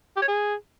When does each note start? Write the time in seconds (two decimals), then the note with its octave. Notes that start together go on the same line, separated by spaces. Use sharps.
0.16 G4
0.22 C#5
0.28 G#4